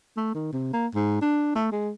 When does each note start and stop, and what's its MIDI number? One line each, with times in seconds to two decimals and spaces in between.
0.17 0.33 57
0.35 0.50 51
0.53 0.70 48
0.74 0.87 58
0.95 1.20 44
1.22 1.50 62
1.55 1.69 57
1.72 1.90 56